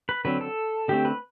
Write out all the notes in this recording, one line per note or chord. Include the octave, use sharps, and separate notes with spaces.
B4
D3 F#3 C4 B4
A4
D3 A3 C4 G4
B4